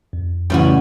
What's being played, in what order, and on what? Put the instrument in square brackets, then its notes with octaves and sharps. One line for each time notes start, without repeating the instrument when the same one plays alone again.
[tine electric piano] F2
[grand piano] A1 C#3 E3 [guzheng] G3 C#4 F#4